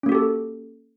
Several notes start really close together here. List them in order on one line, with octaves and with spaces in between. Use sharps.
C#4 A#3 F#4 G4 A4